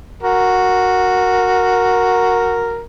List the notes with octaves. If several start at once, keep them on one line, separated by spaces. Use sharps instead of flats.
F#4 A#4